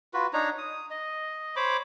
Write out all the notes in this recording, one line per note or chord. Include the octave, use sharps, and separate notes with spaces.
F4 F#4 B4
D4 D#4 C#5 A#5
D#6
D#5
C5 C#5 B5 D6